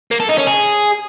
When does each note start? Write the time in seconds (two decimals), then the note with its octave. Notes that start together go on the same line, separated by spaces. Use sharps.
0.11 A#3
0.20 A4
0.29 D#4
0.38 C#4
0.47 G#4